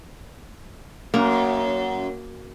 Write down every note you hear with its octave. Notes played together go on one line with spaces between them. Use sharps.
F#2 A#3